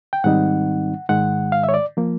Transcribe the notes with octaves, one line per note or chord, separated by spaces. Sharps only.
G5
G#2 D#3 G3 C4 D#4 F#5
G#2 D#3 G#3 F#5
F5
E5
C#5
D5
F3 A#3